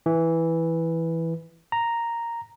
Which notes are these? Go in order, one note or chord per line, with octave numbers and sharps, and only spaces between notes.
E3
A#5